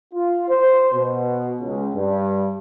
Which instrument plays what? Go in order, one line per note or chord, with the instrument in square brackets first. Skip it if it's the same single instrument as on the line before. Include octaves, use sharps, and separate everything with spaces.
[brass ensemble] F4
C5
B2
C#2
G2